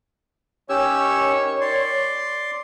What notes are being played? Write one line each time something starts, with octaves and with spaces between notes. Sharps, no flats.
D#3 C#4 G4 C#5 E6
D5 C6